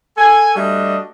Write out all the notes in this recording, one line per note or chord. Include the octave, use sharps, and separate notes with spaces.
A4 G#5
G3 A3 D4 F#4 D#5